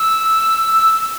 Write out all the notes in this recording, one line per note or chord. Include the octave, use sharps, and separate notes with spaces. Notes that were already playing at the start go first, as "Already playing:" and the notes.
Already playing: E6
E6